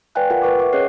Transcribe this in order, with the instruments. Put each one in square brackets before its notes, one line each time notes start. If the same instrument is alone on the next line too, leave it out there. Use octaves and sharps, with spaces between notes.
[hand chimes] B4 D5 F5 G5 G#5 F#6
F4 A#4 F#5 G5
A#4 B4 C#6 D6
E5 F#5 G5 C#6 D6
C#4 G#4 C#5 D#5 F#6 C7